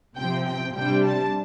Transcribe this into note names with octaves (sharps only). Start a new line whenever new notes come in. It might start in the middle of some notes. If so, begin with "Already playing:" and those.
C3 F3 C4 G5
G5
C3 G3 D4 G5
A5